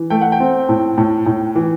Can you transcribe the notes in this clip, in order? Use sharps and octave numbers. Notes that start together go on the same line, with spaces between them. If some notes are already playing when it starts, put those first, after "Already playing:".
Already playing: E3
A3 G5
F#5
G5
C4
A2
A2
A2
E3